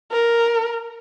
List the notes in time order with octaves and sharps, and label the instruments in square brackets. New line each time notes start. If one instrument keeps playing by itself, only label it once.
[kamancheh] A#4